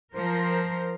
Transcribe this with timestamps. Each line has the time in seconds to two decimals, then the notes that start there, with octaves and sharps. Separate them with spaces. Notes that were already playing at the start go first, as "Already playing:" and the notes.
0.14 F3 A#4 C5